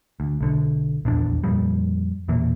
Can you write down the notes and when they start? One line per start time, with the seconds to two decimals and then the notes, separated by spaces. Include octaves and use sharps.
0.20 D2
0.41 B1 D3
1.05 D#1 A#1 E2 D4
1.44 F2 A#2 F3 G3
2.28 E1 A#2 E3 A#3